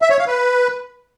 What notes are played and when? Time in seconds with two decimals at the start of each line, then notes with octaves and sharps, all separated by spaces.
0.02 E5
0.10 C#5
0.19 F5
0.27 B4